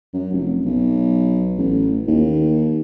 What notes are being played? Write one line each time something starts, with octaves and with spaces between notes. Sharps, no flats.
F#2
F1
B1
A1
D#2